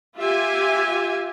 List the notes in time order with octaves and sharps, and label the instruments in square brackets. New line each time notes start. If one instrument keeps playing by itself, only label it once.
[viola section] F4 G4 E5 G#5